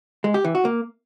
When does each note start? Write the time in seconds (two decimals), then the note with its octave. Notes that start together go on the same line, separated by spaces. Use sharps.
0.24 G#3
0.34 G4
0.44 E3
0.55 F#4
0.65 A#3